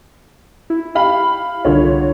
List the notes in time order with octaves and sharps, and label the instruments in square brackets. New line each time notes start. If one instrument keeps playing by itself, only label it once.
[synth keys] E4
[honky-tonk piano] G4 F5 B5
[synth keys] C2 F4 [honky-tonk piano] D3 C#5